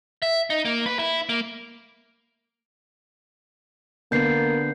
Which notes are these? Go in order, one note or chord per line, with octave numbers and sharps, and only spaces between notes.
E5
D#4
A#3
B4
E4
A#3
D3 A#3 B3 G6 C7